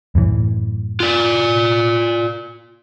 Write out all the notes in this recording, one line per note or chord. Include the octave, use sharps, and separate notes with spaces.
F#2 A2 E3
F4 D5